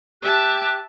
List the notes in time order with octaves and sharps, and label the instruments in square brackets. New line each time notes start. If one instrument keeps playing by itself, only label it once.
[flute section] G4 F#6 [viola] E5 A5